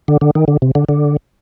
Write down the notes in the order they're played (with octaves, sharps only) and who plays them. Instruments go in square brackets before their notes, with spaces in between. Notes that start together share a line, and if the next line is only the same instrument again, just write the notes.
[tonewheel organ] D3
D3
D#3
D3
C3
D3
D3